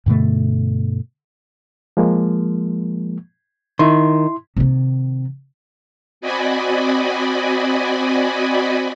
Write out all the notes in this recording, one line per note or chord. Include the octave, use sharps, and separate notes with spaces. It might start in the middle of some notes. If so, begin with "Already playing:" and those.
G2 B2 D3 A3
F3 G#3 A#3
D#3 E4 C6
C3 D#3
C4 F#4 D5 D#5 G#5 B5